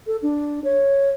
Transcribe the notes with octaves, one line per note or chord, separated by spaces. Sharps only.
A4
D4
C#5